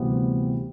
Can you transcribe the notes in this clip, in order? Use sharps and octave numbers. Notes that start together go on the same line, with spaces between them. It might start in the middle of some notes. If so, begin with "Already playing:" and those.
Already playing: D2 C3 E3 G3 B3